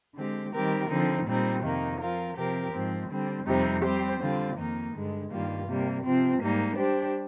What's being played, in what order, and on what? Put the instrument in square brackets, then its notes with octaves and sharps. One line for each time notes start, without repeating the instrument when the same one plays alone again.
[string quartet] D3 G#3 C4 G4
D#3 G3 C4 G4 A#4
D3 F3 C4 D#4
A#2 G3 C4 D#4
F2 C3 D#3 A#3 D#4
F3 C4 F4 A#4
C3 F3 C4 G4 A#4
G#2 F3 C4
D3 G3 C4
F2 C3 G3 C4 D#4
G3 C4 G4 C5
D3 G3 C4 F4
F2 D#3 A#3 D#4
G2 D3 G#3
G2 D#3 G3 A#3 F4
C3 G3 A#3
C3 F3 C4
G#2 G3 A#3 D#4
G3 D4 G4 C5